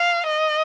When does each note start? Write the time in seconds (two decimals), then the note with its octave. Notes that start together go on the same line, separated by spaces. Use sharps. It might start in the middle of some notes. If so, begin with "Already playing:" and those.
Already playing: F5
0.26 D#5